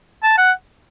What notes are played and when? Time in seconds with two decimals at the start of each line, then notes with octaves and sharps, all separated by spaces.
0.23 A5
0.38 F#5